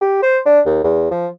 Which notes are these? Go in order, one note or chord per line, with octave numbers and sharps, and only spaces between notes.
G4
C5
D4
D#2
E2
F3